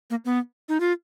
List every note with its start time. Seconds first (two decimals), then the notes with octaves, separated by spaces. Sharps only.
0.10 A#3
0.25 B3
0.69 D#4
0.80 F4